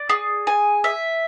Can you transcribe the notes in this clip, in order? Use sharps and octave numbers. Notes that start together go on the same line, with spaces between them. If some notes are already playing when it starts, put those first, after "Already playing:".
Already playing: D5
G#4
G#5
E5